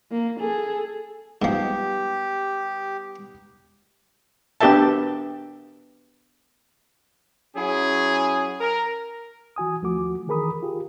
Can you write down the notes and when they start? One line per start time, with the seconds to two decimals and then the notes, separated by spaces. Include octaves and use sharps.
0.11 A#3
0.40 G#4 A4
1.42 G#2 F3 G3 B3 D#4 G4
4.61 B3 D4 G4 A#4 E5 A5
7.56 F#3 C#4 E4 G#4
8.60 A#4
9.56 E3 F#4 G#5 D#6
9.82 D#2 F3 A3 F#4 D6
10.27 D#3 E3 G#4 A#4 B5 D#6
10.62 F4 G4 G#4